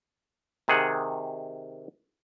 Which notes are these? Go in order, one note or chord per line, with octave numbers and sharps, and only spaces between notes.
C3 D#3 G#4 F#5